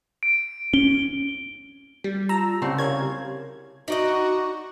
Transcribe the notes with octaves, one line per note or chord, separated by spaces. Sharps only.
D7
C#4 G7
G3
F4 A5 A#5 E6
C2 C#3 C4 G4
A#4 C#5 F5 G#6
D#4 F#4 D5 D#5